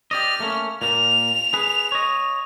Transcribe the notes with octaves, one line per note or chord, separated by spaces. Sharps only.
G4 D5 D#5 F6
A3 A#3 C#4
A#2 A#3 F7
G#4 B4
C#5 D#5